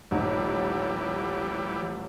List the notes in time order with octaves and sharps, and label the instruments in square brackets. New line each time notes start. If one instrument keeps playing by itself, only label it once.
[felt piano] D#1 A1 D#4 [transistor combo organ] E3 G3